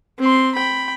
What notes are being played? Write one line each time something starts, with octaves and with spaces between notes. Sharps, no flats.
C4 C6
G5 B5